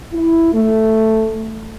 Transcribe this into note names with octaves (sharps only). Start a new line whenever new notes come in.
E4
A3